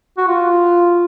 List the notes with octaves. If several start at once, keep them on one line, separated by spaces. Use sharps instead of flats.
F#4
F4